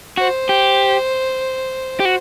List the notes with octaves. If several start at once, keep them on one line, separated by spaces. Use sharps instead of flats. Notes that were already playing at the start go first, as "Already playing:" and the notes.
F#4 C5
G4
G4
F#4